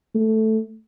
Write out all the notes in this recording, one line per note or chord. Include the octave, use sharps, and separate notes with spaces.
A3